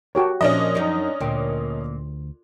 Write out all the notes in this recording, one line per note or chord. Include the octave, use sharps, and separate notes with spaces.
F#4 G4 A#4 C#5 G5 A5
A#2 F3 C#4 D4 C5 D#5 E5
F#2 D#4
D2 A#2 G5